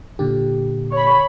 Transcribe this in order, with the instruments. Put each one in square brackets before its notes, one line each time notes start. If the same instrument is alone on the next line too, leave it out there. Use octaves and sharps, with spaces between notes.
[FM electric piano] A#2 D3 G4
[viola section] C#5 B5